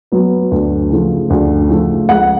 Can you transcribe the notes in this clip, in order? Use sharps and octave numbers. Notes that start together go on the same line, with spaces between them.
F#3 B3
D2
C#3 F3 A3
D2
C#3 F3 A3
C#2 F#5